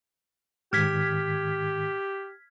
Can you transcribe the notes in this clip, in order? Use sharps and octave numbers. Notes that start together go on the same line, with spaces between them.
G#2 D#3 G4 F6 G#6 B6